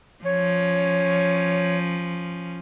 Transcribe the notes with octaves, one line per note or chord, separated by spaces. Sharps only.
F3 C#4 C#5